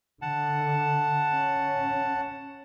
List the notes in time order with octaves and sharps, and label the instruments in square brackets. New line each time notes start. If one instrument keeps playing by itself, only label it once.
[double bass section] D3 [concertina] F#5 A5
[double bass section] C#4